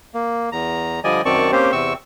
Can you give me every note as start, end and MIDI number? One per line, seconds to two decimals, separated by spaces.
0.14 0.50 58
0.52 1.00 40
0.52 1.00 82
1.04 1.22 50
1.04 1.22 53
1.04 1.22 55
1.04 1.22 74
1.04 1.22 75
1.04 1.22 80
1.25 1.51 42
1.25 1.51 51
1.25 1.51 60
1.25 1.51 74
1.25 1.51 81
1.25 1.51 85
1.52 1.72 58
1.52 1.72 60
1.52 1.72 61
1.52 1.72 67
1.52 1.72 72
1.72 1.93 40
1.72 1.93 48
1.72 1.93 60
1.72 1.93 85
1.72 1.93 88